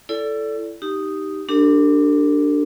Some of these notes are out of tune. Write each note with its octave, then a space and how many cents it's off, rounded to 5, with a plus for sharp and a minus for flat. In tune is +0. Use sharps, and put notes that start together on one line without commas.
E4 +30 A4 +0 D5 -20
D#4 +0 G4 -10
D4 +0 G4 +0 A#4 -45